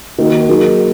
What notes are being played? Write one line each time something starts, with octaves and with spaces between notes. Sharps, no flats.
D#3 A#3 F#4
F#3 A#3 D#4 G#4